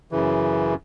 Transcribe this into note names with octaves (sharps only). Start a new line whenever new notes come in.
F#2 C#3 E3